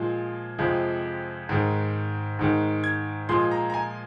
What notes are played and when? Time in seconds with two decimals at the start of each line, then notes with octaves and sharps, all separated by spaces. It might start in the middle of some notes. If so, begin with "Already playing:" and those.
Already playing: A#2 F3 G#3
0.59 F2 C3 F3 G#3
1.49 G#2 D#3 G#3
2.39 G#2 D#3 G#3
2.84 G#6
3.29 A#2 F3 G#3 C6
3.51 A#5
3.70 A#5
3.74 G#5